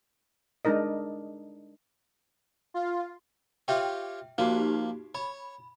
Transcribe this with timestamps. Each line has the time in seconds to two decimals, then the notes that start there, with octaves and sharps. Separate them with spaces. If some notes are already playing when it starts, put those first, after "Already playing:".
0.65 G#3 D4 D#4 A#4 D#5
2.74 F4
3.68 F4 G4 C#5 E5 G5
4.38 F3 A#3 D#4 F#4 G4 D5
5.15 C#5 B5